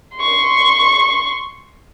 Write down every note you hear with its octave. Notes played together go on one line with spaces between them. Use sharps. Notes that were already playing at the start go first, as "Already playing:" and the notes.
C6 C#6